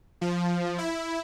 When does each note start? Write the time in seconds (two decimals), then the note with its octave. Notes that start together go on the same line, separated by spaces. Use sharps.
0.21 F3
0.78 E4